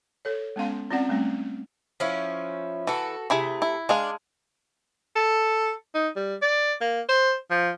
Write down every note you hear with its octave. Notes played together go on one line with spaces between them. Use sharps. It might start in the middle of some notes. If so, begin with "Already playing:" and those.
A4 C#5
G#3 B3 C#4 F5 C6
C4 C#4 F4 D5 F#5
G3 A3 C4 C#4
F3 C#4 E4
E3 F#4 A4
C3 A3 E4 G#4 B5
E4
G#3 D4 G#4 F5
A4
D#4
G3
D5
A#3
C5
F3